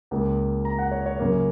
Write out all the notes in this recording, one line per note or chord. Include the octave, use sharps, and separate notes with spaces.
C#2 C#3 A#3
A#5
F#5
C#5
C#5
F#2 C#3 A#3